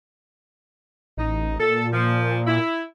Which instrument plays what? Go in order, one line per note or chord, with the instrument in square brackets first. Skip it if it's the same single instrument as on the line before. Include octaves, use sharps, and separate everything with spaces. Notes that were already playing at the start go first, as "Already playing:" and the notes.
[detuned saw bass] A1 [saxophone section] D#4
[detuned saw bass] A#2 [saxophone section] A4
[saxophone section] F3
E4